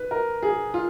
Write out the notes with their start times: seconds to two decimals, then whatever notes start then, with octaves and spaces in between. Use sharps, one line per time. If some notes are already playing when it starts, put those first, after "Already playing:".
Already playing: B4
0.11 A#4
0.43 G#4
0.74 F4